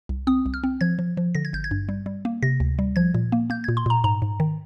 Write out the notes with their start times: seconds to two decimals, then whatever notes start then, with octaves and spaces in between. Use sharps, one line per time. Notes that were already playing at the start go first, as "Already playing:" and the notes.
0.09 C2
0.27 C4 D#6
0.46 C2
0.54 F6
0.64 C4
0.81 F3 G#6
0.99 F3
1.17 F3
1.35 D3 A#6
1.45 G#6
1.53 G#1 G6
1.64 G#6
1.71 G2
1.89 G3
2.06 G3
2.25 A#3
2.43 C3 A#6
2.60 D2
2.79 G3
2.96 F3 G#6
3.14 A#2
3.32 A#3
3.50 A#3 G6
3.64 G#6
3.68 A#2
3.77 C6
3.86 A#2 A#5
4.04 G#2 A#5
4.22 G#2
4.40 D#3